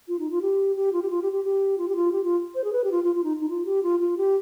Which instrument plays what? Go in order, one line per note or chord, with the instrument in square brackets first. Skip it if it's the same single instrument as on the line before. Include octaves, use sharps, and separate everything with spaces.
[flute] F4
D#4
F4
G4
G4
F4
G4
F4
G4
G4
G4
F4
G4
F4
G4
F4
C5
G#4
B4
G4
F4
F4
F4
D#4
D#4
F4
G4
F4
F4
G4